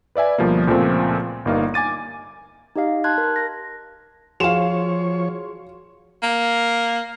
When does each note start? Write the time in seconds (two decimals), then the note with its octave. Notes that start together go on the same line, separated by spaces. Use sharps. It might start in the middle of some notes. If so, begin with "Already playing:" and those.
0.15 B4 D5 E5 G#5
0.38 D2 B2 F3 G3 A#3
0.67 C#2 A#2 F3 A3 C4
1.45 G1 G3 A#3 D#4 F5
1.74 G#5 D6 A6 D#7
2.76 D#4 G4 D#5 F5
3.04 A5 C6 F#6 G#6
3.18 A#4
3.36 A#6
4.40 F3 F#4 G#4 C#5 F5 C6 E7
6.23 A#3